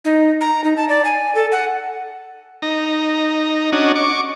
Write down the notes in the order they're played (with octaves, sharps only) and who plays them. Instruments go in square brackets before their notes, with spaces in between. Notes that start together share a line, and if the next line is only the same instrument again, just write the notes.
[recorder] D#4
A#5
D#4
A5
D5
G#5
A4
F#5
[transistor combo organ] D#4 A#5
C#4 D4 F#4 D#5
C#6 D6